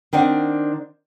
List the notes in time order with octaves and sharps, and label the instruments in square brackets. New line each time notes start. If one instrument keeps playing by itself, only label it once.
[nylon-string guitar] D#3 C4 D4 F#5